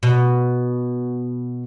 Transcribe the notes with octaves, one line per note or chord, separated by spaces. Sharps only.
B2